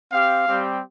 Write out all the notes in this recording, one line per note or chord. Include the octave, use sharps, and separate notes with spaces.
C4 G4 F5
G3 C4 G4